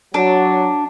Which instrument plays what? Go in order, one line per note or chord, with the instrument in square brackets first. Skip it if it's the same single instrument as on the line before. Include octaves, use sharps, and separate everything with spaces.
[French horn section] F#3 [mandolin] D4